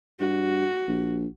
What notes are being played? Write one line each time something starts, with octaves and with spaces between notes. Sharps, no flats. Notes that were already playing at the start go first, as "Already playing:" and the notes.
G2 F#4
A#1